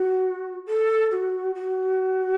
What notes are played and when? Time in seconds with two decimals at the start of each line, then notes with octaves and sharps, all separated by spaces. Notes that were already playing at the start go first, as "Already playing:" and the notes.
Already playing: F#4
0.66 A4
1.11 F#4
1.54 F#4